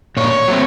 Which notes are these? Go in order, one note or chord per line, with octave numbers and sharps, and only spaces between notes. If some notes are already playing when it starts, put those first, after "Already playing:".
A#2 C#5
F#3 A3 C4